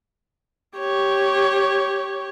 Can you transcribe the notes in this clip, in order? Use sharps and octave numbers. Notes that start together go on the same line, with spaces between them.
G4 C#5